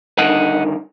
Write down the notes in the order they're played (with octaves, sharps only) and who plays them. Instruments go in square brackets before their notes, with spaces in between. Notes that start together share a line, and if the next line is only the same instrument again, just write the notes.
[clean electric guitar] G2 D3 D#3 [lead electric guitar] D#5 F#5